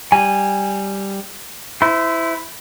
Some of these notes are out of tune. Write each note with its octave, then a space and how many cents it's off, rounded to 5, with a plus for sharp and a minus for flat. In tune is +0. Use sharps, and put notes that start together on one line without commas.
G3 +0 G#5 -10
E4 +0 C5 -35